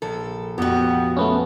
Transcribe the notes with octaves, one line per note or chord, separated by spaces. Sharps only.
A#1 A4
F2 B3 F#4 G4
A3 B3 C#4